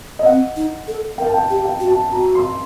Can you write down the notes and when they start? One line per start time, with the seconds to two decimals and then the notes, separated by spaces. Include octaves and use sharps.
0.19 D#5
0.26 C4 F#5
0.56 D#4
0.87 A4
1.18 A#4 G5
1.26 A5
1.34 G5
1.50 G4
1.65 G5
1.80 F#4
1.88 A5
2.11 F#4 A#5
2.35 C6